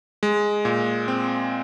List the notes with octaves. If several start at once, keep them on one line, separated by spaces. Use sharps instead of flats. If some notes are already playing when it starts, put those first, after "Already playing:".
G#3
A#2
C4